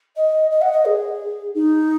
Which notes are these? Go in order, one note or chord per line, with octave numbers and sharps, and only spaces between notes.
D#5
D#5
F#5
D#5
G#4
D#4